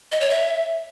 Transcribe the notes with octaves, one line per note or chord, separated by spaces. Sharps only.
D#5
C#5
E5